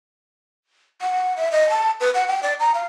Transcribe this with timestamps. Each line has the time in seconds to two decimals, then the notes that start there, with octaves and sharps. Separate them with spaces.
1.02 F#5
1.37 E5
1.52 D#5
1.70 A5
2.00 B4
2.14 F#5
2.28 G5
2.43 D5
2.60 A#5
2.74 F5